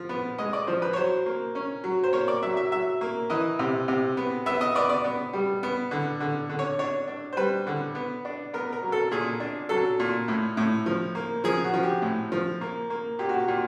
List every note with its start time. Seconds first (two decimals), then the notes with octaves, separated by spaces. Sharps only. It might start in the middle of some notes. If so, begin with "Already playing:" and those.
Already playing: F3
0.09 B3
0.38 G#3 D#5
0.53 D5
0.67 F3 C5
0.82 B4
0.93 C#5
0.96 F#3 C5
1.26 A#3
1.55 C#4
1.84 F#3
2.04 C5
2.13 A#3 C#5
2.28 D5
2.42 F#3 E5
2.57 E5
2.71 F#3 E5
3.01 A#3
3.30 E3 D#5
3.59 C3
3.88 C3
4.17 B3
4.46 B3 E5
4.61 D#5
4.75 B3 D5
4.89 D5
5.04 B3
5.33 G3
5.63 B3
5.91 D3
6.20 D3
6.50 D3
6.59 C#5
6.79 D4 C#5
7.08 D4
7.33 C5
7.37 G3 B4
7.67 D3
7.95 B3
8.25 D4
8.53 B3 A#4
8.72 A#4
8.83 F#3
8.92 A4
9.11 A#2 G#4
9.40 D4
9.69 F#3 A4
9.99 A#2
10.28 A2
10.57 A2
10.86 F3
11.15 A#3
11.44 F3 G#4
11.64 F#4
11.74 F3
11.83 G4
12.02 A2
12.32 F3
12.61 A#3
12.90 A#3
13.19 A#2 G4
13.29 F#4
13.39 G4
13.48 A#2